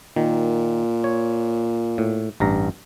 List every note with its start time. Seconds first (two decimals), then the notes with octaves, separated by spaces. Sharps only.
0.16 A#2 D#3
1.04 C#5
1.98 A2
2.40 A1 G2 A#5